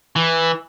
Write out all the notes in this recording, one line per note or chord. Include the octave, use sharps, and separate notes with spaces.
E3